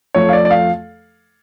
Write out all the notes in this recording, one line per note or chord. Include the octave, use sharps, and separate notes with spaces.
F2 F3 A3 C#5
F5
D5
D5
F5